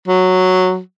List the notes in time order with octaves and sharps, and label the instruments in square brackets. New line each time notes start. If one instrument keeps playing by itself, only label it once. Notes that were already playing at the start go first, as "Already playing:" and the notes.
[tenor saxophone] F#3